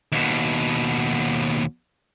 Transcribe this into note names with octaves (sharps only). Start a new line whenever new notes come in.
D#2 B2